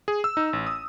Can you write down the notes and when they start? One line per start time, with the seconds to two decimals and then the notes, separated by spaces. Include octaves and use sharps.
0.08 G#4
0.24 E6
0.37 D#4
0.53 A1
0.67 D#6